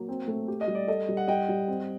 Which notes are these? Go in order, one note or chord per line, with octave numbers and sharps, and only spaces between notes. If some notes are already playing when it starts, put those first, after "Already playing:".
Already playing: F#3 A#3
C4
A3
G4
D#5
G3
D5
A4 D#5
G3
F#5
G3 D#5 G5
G3
C4